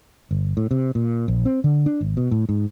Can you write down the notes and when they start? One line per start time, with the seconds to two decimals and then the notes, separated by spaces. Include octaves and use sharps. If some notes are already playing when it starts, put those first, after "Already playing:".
0.31 G1
0.57 A2
0.71 C3
0.95 A#2
1.28 A#1
1.45 C4
1.64 D3
1.86 D4
2.01 G#1
2.17 B2
2.31 A2
2.49 G#2